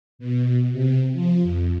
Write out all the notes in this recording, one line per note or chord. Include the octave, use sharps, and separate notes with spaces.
B2
C3
F3
F2